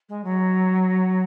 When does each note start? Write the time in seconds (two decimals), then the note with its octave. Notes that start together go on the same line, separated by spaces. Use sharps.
0.09 G#3
0.24 F#3